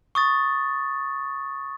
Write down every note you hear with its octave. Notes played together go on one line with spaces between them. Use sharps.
C#6 D#6 A6